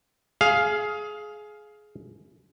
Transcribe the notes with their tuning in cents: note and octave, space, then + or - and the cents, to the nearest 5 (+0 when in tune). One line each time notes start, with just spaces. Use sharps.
G#4 +20 F5 +0